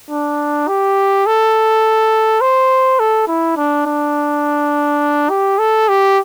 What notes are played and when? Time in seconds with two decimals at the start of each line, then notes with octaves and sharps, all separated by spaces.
0.10 D4
0.68 G4
1.26 A4
2.41 C5
3.00 A4
3.28 E4
3.56 D4
3.86 D4
5.30 G4
5.59 A4
5.89 G4